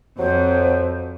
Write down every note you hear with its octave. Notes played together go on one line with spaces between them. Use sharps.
F2 F#3 C5